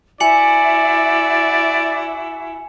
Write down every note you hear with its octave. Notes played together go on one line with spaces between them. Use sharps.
E4 F#4 D5 E5 G#5 C#7 F#7